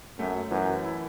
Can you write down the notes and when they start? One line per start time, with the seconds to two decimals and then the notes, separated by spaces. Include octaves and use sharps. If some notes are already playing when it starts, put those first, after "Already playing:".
0.18 F#2 A3
0.51 F#2 E3
0.85 E4